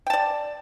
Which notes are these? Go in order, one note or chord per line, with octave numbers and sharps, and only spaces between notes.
D5 G5 A5